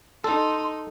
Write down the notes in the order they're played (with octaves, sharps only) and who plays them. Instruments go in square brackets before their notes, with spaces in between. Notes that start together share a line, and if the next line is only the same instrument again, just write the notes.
[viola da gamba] D#4 [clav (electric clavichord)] A4 [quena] C6